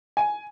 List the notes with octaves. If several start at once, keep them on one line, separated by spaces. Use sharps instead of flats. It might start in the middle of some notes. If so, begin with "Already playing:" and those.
G#5